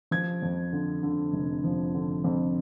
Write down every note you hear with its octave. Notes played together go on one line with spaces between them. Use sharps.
F3 G#6
F2
D3
D3
F1
F3
D3
F2